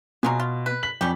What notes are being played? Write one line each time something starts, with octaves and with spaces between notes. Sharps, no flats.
B2 F#3 F4 G#4
F4
B4
B6 F#7
F2 G3 C#4 G4